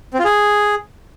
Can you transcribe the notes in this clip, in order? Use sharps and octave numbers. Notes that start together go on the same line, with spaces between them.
C4
F4
G#4